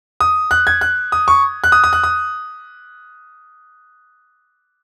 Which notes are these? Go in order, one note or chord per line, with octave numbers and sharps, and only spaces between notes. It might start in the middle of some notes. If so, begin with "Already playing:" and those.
D#6
F#6
G#6
F#6
D#6
C#6
F#6
D#6
D#6
F#6
D#6